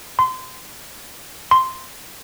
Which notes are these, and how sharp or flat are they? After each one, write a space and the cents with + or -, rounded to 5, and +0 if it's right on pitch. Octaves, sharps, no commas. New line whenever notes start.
C6 -25
C6 -5